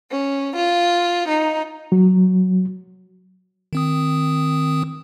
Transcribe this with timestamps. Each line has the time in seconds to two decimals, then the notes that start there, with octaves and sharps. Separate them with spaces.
0.11 C#4
0.56 F4
1.28 D#4
1.92 F#3
3.73 D#3 C4 D#6